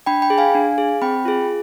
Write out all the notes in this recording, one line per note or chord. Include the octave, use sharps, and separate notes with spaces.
D4 G5 B5
G5 B5
G#4
F5 G#5
D4
G#4
C4 G5 B5
F4 G#4